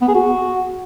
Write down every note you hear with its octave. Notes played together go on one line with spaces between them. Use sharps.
B3
G#4
F#4